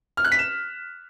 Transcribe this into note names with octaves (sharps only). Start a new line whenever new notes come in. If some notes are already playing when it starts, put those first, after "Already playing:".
F6
F#6
B6
E7